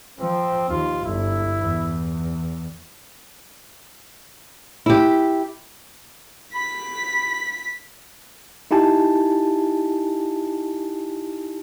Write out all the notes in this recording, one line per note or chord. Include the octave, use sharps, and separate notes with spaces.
F3 C4
D#2 F4
G1 E4
E2
E4 G4
B5 B6
D#4 E4 G4 G#5 A5